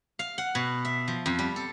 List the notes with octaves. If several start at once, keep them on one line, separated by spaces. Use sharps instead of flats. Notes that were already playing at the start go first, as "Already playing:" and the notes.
F5
F#5
B2
E5
F3
F2
G3
A4